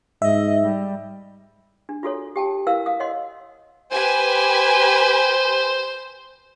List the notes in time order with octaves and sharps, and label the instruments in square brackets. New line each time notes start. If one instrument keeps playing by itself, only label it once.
[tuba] G#2 [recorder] D#5 [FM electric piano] E5
[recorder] G3
[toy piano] D4
F4 F#4 A4 C#5
G4 G5 A5
E4 A#4 B4 F5 E6
F5 D#6
C#5 D#5 F#5 C6
[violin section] G4 B4 G#5 [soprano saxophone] C5